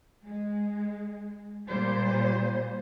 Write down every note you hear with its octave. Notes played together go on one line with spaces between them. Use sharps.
G#3
A#2 G3 C5